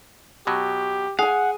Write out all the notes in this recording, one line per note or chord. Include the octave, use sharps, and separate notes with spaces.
B2 F#3 G4
G#4 F5 F#5 G#5